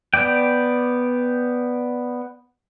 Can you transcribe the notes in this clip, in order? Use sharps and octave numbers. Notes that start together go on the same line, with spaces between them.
B3 D5 G5